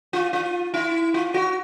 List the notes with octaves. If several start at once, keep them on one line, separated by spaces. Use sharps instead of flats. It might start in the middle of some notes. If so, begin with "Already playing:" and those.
F4
F4
E4
F4
F#4